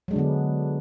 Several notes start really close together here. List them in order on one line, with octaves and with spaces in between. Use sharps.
F#3 G#3 D4 D3 B3